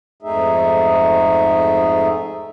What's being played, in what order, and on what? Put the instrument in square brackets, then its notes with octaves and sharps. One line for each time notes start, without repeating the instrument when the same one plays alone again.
[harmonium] F2 G#2 A3 D#4 G#4 E5